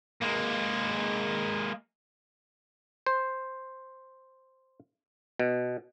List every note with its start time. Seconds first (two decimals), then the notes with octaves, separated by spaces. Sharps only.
0.21 G#3 A#3
3.06 C5
5.39 B2